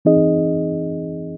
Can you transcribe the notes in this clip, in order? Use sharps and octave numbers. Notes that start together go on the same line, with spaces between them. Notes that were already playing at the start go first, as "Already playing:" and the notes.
E3 C4 D#4 G#4 D#5